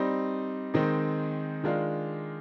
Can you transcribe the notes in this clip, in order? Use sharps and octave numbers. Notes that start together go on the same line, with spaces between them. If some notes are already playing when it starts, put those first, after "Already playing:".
Already playing: G3 C4 D#4
D#3 G#3 C4 D#4
D#3 G#3 D4 F4